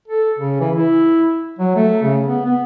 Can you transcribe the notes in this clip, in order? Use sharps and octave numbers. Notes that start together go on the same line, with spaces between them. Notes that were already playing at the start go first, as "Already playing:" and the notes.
A4
C#3
E3
E4
F#3
A3
C#3
B3
B3